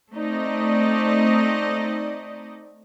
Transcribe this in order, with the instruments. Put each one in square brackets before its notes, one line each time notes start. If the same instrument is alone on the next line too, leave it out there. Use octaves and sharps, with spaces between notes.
[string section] A3 C4 D#4 D5 D#5